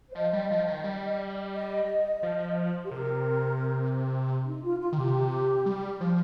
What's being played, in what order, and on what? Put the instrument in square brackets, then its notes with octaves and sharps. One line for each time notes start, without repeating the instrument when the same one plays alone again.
[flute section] C5
[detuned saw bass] F3 [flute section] D#5
[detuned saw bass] G3
F3
D#3
G3
[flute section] D#5
[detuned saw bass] F3
[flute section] G4
[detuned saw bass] C3 [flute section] A#4
[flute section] D#4
F4
F4
[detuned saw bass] D#3
[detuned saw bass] C3 [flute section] G4
[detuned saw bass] G3
F3